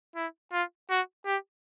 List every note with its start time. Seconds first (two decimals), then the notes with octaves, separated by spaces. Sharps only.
0.16 E4
0.52 F4
0.90 F#4
1.26 G4